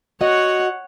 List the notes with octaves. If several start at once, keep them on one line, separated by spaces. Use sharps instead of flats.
F#4 C#5 D#5 F#5